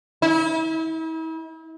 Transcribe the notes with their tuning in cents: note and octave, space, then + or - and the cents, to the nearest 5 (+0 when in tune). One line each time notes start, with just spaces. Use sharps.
E4 -40